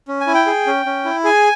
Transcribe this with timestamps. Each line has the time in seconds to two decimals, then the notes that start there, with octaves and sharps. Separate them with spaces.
0.08 C#4
0.21 G#5
0.27 E4
0.34 G5
0.46 G#4
0.67 C#4
0.86 C#4
1.05 E4
1.24 G#4 G#5